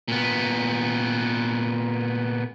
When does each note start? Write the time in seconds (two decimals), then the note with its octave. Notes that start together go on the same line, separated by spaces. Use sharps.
0.08 A#2 B3